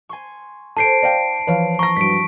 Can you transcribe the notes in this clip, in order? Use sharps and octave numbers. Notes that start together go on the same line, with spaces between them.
G#5 C6 C#6
D4 A4 C5 C#5 A5 C7 D7
D5 F5 G5 A#6
E3 F3 B4 C#5 F5
A#5 C#6 A#6
G2 F#3 B6 D7